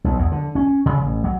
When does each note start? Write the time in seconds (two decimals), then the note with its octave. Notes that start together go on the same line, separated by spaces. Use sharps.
0.04 B1
0.19 E2
0.32 D3
0.55 C#4
0.86 C#3
1.03 A1
1.24 F#3